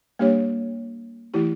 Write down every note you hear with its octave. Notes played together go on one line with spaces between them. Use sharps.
G3 A#3 D4 G4 C#5
E3 A3 E4 G4